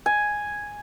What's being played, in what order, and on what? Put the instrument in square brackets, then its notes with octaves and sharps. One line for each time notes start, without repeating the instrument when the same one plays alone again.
[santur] G#5